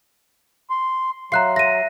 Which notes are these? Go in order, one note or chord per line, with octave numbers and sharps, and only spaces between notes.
C6
F#3 E5 F5 A#5 C6 F#6 C7
E5 A#6 D#7